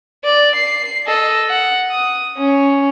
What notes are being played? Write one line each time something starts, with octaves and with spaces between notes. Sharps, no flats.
D5
C7
A4 D#5
F#5
D#6
C#4